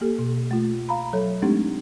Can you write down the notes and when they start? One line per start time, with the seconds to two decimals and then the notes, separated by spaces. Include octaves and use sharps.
0.01 A#3 G4 A4
0.19 B2
0.51 A3 F4
0.89 F5 A#5 B5
1.13 F#3 A4 C#5
1.42 G#3 A3 C4 D4 D#4 G4